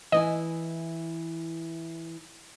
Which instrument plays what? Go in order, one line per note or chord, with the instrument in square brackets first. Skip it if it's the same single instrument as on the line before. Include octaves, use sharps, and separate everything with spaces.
[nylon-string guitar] E3 E4 G#5 [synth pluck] D#5